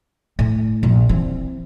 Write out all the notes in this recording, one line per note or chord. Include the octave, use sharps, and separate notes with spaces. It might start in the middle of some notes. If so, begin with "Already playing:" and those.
A2
A#1
E3 C4